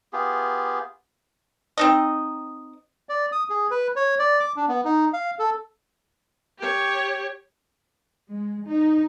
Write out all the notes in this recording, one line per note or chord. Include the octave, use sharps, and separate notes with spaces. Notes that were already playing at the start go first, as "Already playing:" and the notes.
B3 F4 G4 G#4
C4 D#4 D#5
D5
D#6
G#4
B4
C#5
D5
D6
D4
B3
D#4
F5
A4
G4 C#5
G#3
D#4